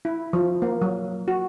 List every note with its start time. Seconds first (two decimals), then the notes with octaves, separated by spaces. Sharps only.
0.05 E4
0.33 F3
0.62 A#3
0.82 F#3
1.28 F#4